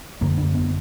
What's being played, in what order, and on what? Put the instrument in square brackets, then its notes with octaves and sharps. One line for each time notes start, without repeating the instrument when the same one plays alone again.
[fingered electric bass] F#2 D3 A#3
D4
B3